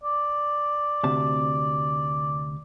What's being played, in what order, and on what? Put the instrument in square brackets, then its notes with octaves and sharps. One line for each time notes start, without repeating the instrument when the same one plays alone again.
[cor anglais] D5
[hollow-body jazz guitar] D2 C3 A5